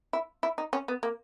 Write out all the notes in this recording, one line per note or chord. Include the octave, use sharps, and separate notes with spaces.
E4
E4
D#4
C#4
B3
A#3